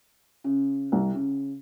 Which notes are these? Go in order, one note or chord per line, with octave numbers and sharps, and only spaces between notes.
C#3
C2
C#3